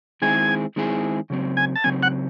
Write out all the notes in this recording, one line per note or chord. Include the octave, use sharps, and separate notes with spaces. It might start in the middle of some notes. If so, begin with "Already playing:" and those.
D#3 G#3 C4 E4 G#4 G#5
D#3 G#3 C4 E4 G#4
C#3 F#3 C4
G#5
A5
C#3 F#3 C4 G#5
F#5